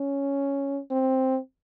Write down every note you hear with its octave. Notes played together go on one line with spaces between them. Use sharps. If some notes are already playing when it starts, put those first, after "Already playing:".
Already playing: C#4
C4